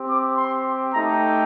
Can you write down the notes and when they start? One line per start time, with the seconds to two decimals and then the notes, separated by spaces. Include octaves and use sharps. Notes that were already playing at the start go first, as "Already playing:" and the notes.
Already playing: C4 G4
0.10 D6
0.37 C6
0.94 A3 D#4 G4 A#5